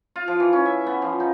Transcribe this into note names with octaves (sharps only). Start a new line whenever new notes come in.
F4
F3
E3
C#4
E5
B3
F3
D#4